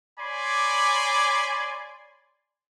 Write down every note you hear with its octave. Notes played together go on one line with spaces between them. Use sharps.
C#5 D5 G#5 B5 C6 D6